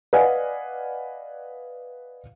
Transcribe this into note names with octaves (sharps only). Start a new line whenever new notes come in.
B4 D5 D#5 F5 F#5 G#5